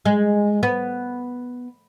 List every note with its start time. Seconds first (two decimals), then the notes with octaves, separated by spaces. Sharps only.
0.05 G#3
0.63 B3